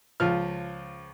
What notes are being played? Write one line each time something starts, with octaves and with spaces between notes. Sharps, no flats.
C#2 F3 F6